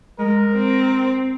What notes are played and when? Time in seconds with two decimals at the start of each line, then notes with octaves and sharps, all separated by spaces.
0.19 G#3 A#4
0.55 C4